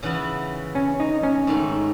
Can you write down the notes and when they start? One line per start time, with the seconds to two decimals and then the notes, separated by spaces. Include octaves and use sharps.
0.03 C#3 E3 B3 E4
0.75 C#4
1.00 D#4
1.23 C#4
1.47 G#2 D#3 A3